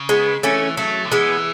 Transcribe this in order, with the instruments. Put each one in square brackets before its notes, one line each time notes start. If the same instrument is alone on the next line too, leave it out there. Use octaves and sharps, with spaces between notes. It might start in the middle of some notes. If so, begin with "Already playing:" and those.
Already playing: [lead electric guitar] C#3
[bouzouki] G#3 B3
[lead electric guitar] E3 [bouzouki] A3 C#4
[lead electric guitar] F#3 [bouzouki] A3
[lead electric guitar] D3
[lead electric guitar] E3 [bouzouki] G#3 B3